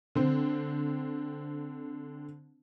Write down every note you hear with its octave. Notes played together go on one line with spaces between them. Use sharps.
D3 C4